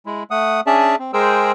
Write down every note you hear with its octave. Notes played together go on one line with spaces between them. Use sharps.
G#3 E4
A3 F#5 D#6
C#4 D4 G#4 D5 E5 A5
C4
G#3 G#4 A#4 C5 G5 E6